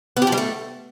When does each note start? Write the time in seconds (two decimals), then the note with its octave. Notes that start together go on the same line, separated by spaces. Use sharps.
0.17 B3
0.22 G4
0.27 F3
0.32 G3
0.38 A3